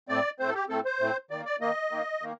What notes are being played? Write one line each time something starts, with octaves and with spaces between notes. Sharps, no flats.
A2 A3 C4 D5
A2 A3 C4 C5
A4
G4
A2 A3 C4 A4
C5
A2 A3 C4
D#3 A#3 D5
D5
D#3 A#3 D#5
D#3 A#3
D#3 A#3